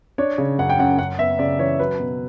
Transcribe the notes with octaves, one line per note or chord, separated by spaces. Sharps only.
D4 C#5
C#3
F#2 F#5
G5
F#2 F#5
F#2 F#5
B3 E5
C#3 D5
E3 C#5
F#3 B4
B2